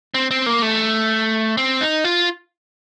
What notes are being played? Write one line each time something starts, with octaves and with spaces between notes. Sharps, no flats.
C4
C4
A#3
A3
C4
D#4
F4